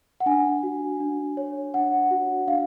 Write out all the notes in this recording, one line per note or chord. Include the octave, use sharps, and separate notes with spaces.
F#5
D4 G#5
F#4
D4
C#5
D4 F#5
F#4
D4 F5